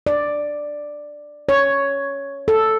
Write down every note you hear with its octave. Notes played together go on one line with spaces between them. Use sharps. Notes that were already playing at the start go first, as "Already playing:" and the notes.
D5
C#5
A4